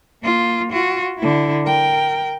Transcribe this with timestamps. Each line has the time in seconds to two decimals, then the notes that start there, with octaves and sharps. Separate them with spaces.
0.23 A#3 F4
0.72 F4 F#4
1.18 D3 E4
1.66 A#4 G5